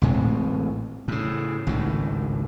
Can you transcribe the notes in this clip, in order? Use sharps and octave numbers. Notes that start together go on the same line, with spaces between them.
A1 A2 G#3 C4
A2 C#3
G#1 C#2 A2 D#3